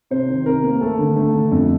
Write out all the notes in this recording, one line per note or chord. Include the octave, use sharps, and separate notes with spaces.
C3 C5
D#3
C3 A#4
A#3
A3 A4
D3
A3
D3
F2